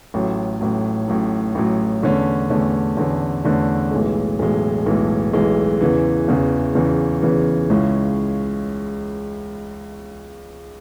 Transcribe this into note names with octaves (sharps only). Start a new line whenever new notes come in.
A1 A2 F#3
A1 A2 F#3
A1 A2 F#3
A1 A2 F#3
E2 D3 A3 C#4
E2 D3 A3 C#4
E2 D3 A3 C#4
E2 D3 A3 C#4
B1 A2 E3 G#3
B1 A2 E3 G#3
B1 A2 E3 G#3
B1 A2 E3 G#3
E2 C#3 E3
E2 C#3 E3
E2 C#3 E3
E2 C#3 E3
C#2 C#3 G#3 C#4 E4